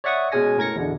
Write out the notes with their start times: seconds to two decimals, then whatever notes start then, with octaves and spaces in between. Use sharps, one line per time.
0.04 C#5 D5 E5 F#5 C#6 D#6
0.32 B2 G#3 C#4 G#4 G#5 A#6
0.58 A2 A#4 G#6 A#6 C#7
0.76 E2 B2 D3